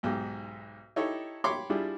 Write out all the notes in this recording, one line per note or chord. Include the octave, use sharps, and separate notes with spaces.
B1 G#2 G4
D#4 E4 G4 A4 C#5
G4 C#5 B5 C6 D6
G3 D4 E4 F4 G4 G#4